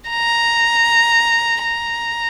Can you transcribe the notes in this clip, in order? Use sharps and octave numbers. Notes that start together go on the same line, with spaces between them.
A#5
A#5